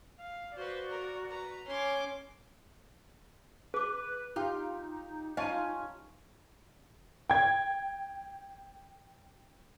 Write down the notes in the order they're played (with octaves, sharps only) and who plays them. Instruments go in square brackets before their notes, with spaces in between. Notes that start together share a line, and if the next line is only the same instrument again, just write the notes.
[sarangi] F5
[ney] F#4 [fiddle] B4 C5 [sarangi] D5
[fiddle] A#4
B4 A#5
[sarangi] C#4 [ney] C#5 [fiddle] C6 D6
[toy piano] G#4 D6 [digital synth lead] B4
[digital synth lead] D#4 [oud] F4 [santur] G4
[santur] C#4 [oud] F4 [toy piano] D#5 A5
[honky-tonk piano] G5 G#6